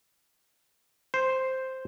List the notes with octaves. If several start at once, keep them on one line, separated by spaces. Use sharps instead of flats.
C5